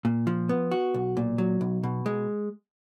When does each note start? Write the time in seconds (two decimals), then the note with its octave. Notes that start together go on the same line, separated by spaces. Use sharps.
0.05 A#2
0.27 F3
0.49 B3
0.71 F#4
0.94 B1
1.17 A#2
1.38 F#3
1.61 B1
1.83 B2
2.06 G#3